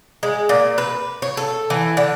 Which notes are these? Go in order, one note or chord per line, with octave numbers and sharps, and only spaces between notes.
G#3
A#2
B4
C#5
A4
E3
D3